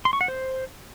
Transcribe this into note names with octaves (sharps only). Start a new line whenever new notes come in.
C6
C#6
F#5
C5